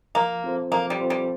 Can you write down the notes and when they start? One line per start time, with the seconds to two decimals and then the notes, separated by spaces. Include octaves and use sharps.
0.15 F3 A#3
0.44 C4 F4 A4 C5
0.71 F3 A#3
0.90 G3
1.00 C4 F4 A4 C5
1.10 G3